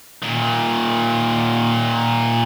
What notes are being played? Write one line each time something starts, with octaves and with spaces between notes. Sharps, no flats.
A#2 D#3